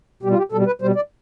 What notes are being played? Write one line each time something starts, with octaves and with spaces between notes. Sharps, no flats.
B2 G3 G4
F4
G4
B2 G3 A4
B4
B2 G3 C5
D5